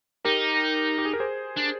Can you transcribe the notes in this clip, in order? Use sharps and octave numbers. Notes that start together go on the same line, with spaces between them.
D#4 G4 A#4
G4
G#4
A#4
G#4 C5
D4